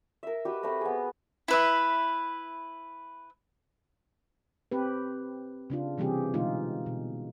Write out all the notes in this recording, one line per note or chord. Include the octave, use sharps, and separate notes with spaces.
A#4 E5
F#4 G4 B4 D#5
A3 C4 B4 A#5
B3 G#4
E4 B4 E5
C4 G4 B4
C#3 D4 F4
C3 E3 G3 C4 G4 G#4
B2 D3 E3 G#3 D#4 F4
B2